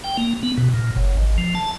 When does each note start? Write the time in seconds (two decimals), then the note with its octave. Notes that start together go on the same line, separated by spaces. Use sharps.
0.04 G5
0.18 A#3
0.43 B3
0.58 B2
0.74 A#2
0.96 F#1
1.17 G#1
1.38 F3
1.55 A5